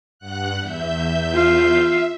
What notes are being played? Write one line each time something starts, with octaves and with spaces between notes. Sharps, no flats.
G2 F#5 F#6
E2 E5 G6
F4 F5
E5